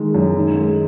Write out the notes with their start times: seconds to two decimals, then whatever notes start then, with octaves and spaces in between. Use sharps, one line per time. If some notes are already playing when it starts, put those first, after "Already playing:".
Already playing: D#3 G#3
0.15 F#2
0.36 D#3
0.57 G#3